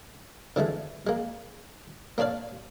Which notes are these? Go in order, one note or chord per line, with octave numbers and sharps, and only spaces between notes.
D3 E3 G#3 A3
G#3 A#3
A#3 D4 C#5 D5 F5